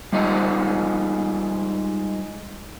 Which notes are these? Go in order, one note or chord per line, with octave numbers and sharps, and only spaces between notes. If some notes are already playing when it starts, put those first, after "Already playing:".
G3 G#3 D#4 F4 D#5